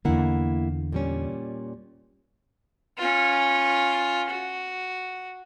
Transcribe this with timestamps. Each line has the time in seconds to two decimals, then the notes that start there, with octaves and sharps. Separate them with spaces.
0.05 E2 D3 A#3 E4 F#5
0.93 A#2 G3 C#4
2.98 C#4 F4
4.30 F#4